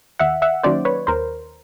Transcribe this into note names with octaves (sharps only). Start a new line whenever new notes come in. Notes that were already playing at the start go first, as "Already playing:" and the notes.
D#2 E5 F#5
E5 F#5
D#3 F#3 A#3 C#4 C5 D5
B4 C#5
D#2 A#4 C5